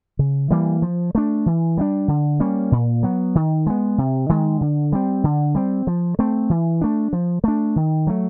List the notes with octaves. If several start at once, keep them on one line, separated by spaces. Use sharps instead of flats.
C#3
E3 G3 A#3
F3
A3 D4
E3
G3 A#3 D4
D3
G3 A#3 C#4
A#2
F#3 B3
D#3
G#3 B3
C3
D#3 G#3
D3
G3 C4
D3
G3 C4
F3
A3 C4
E3
A3 D4
F3
A3 D4
D#3
F#3 A3